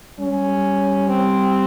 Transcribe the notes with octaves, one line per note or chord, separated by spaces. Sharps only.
G3 C#4
C4